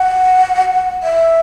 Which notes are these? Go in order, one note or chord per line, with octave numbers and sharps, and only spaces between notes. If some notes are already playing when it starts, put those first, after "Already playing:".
Already playing: F#5
E5